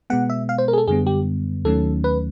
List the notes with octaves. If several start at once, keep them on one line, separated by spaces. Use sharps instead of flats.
B2 G#3 B3 F#5
E5
F5
C5
A#4
G#4
A4
F#2 D3 G3 B3 G#4
G4
D#2 D#3 F#3 A3 C#4 A4
B4